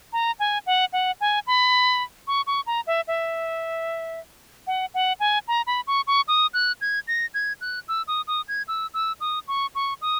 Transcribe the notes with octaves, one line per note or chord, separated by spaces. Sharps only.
A#5
G#5
F#5
F#5
G#5
B5
C#6
C#6
A#5
E5
E5
F#5
F#5
G#5
A#5
B5
C#6
C#6
D#6
F#6
G#6
A#6
G#6
F#6
E6
D#6
D#6
G#6
E6
E6
D#6
C#6
C#6
D#6